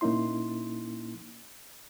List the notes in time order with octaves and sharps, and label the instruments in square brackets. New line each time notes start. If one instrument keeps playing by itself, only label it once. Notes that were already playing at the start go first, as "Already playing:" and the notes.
[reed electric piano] A#2 A#3 C#4 D#4 E4 C6